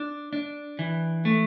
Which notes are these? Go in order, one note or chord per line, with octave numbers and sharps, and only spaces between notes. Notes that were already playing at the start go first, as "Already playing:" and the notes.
Already playing: D4
D4
E3
A3